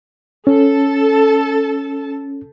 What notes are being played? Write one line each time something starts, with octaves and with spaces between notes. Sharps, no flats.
C#4 A4 A5